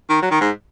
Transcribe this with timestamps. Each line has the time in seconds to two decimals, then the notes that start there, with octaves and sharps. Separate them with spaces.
0.09 D#3
0.22 F#3
0.31 D#3
0.40 G#2